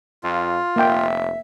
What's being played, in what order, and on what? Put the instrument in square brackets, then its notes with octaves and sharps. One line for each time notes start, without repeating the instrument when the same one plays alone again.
[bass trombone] F2 [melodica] F4
[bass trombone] F1 [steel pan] A#3 G5 [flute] E5